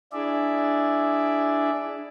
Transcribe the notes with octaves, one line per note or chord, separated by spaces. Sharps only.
D4 E4 G#4 D5 E5